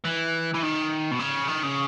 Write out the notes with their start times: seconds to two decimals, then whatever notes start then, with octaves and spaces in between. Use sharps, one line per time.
0.05 E3
0.54 E3
0.63 D#3
1.11 B2
1.19 C#3
1.48 D#3
1.63 C#3